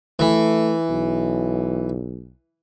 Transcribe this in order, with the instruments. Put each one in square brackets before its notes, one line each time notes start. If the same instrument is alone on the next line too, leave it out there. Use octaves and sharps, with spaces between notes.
[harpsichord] E3 [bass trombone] A3
[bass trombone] B1